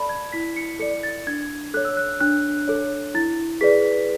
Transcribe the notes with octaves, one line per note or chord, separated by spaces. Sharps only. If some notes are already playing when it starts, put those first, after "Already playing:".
Already playing: A4 D5 A5 B5
G#6
E4 B6
C#7
A4 D5 C#7
A6
D4 G#6
A4 C#5 F#6
E6
F#6
D4 F#6
A4 C#5
E4 A6
G#4 B4 D5 B6